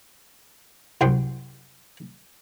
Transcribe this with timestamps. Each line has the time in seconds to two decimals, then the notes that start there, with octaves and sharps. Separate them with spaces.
1.01 C2 F#2 G5 C6